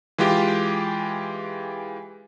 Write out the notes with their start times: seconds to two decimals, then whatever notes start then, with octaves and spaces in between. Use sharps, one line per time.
0.18 E3 G#3 F4 G4